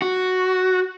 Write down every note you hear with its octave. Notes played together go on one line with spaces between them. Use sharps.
F#4